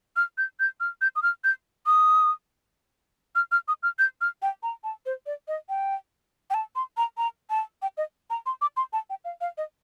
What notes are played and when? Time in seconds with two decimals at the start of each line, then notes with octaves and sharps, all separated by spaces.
0.16 F6
0.38 G6
0.60 G6
0.80 F6
1.01 G6
1.16 D#6
1.23 F6
1.44 G6
1.86 D#6
3.35 F6
3.52 F6
3.68 D#6
3.83 F6
3.99 G6
4.21 F6
4.42 G5
4.63 A#5
4.84 A5
5.06 C5
5.26 D5
5.48 D#5
5.69 G5
6.50 G5
6.54 A5
6.76 C6
6.97 A#5
7.17 A#5
7.50 A5
7.82 G5
7.97 D#5
8.30 A#5
8.46 C6
8.61 D6
8.77 C6
8.93 A5
9.10 G5
9.25 F5
9.41 F5
9.58 D#5